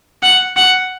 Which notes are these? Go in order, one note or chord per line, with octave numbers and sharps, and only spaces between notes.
F#5
F#5